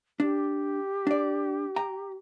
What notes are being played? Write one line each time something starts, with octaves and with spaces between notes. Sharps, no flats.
D4 G4
D4 D5
G5 A#5